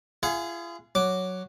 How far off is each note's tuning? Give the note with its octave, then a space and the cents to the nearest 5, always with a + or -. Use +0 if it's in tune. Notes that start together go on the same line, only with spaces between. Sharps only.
F4 -45 G#4 +0 F#5 -40
F#3 +0 D6 +0